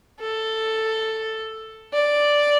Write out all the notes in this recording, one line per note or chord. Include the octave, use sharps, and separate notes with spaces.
A4
D5